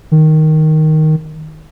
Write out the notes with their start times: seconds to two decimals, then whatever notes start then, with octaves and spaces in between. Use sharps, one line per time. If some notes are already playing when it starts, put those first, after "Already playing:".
0.11 D#3